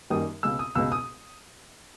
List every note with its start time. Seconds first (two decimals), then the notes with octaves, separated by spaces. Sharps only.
0.10 F#2 D#3 G3 A#3 D#6
0.43 C#2 B2 G#3 E6
0.59 D#6
0.75 C#2 B2 G#3 E6
0.92 D#6